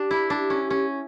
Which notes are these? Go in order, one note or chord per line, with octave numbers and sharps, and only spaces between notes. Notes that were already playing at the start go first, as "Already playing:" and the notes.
Already playing: D4 G4
E4
D4
C#4
C#4